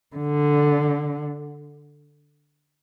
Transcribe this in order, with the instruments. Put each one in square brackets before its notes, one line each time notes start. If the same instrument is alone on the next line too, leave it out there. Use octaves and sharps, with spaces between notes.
[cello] D3